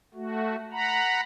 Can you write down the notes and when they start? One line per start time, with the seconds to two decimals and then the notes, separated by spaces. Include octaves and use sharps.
0.14 A3 F#4
0.72 F#5 A#5 B5